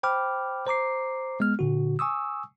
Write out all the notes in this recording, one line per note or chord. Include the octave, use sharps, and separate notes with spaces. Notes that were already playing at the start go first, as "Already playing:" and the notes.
C5 G5 B5 D6 F6
C5 A#5 D6 C7
G#3 B3 F6
A#2 D3 F#4
G#5 C#6 D#6 E6